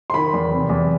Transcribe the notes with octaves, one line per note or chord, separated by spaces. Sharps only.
C6
D#3 B5
E2
C3
E2